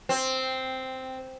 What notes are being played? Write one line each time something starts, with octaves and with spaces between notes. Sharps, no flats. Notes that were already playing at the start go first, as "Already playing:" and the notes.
C4